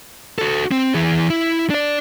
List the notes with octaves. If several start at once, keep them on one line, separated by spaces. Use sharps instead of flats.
F#4 A4
C4
E3 G#4
E4
D4 D5